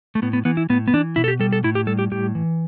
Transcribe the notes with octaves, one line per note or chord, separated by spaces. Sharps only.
A3
A2 B3
B3
E3 B3
E4
A2 B3
B3
E3 D4
B2 E4
A4
G4
G3 A4
A4
A2 E4
G4
G3 A4
G4
A2 G4
E3